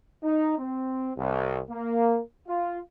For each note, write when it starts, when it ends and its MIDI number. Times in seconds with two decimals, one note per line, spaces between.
0.24 0.57 63
0.58 1.11 60
1.17 1.60 36
1.70 2.19 58
2.48 2.79 65